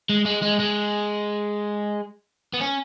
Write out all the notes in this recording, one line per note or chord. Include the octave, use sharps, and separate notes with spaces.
G#3
G#3
G#3
G#3
B3
C#4